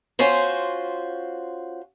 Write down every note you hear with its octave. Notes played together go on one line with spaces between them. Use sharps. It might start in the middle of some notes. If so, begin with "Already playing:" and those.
C#4 F4 F#4 C5